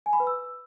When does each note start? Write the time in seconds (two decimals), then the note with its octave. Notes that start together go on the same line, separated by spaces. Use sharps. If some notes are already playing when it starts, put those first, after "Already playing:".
0.06 G#5
0.13 B5
0.20 B4
0.27 E6